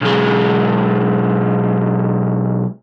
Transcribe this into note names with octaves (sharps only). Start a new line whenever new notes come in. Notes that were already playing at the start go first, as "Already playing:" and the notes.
B1 G#3